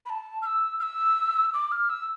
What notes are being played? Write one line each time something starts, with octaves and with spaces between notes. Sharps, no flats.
B5
A5
F6
E6
F6
E6
D6
F6
E6